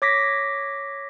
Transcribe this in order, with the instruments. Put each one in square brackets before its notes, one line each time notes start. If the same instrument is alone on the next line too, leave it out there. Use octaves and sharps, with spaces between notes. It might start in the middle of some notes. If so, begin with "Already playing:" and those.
[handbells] C#5 D6 A#6 B6